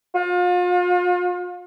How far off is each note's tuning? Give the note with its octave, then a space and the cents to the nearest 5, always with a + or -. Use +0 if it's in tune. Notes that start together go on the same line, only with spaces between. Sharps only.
F4 +40